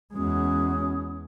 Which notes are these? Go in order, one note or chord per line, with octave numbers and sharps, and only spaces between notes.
E2 G#3 C#4 F#4 D#6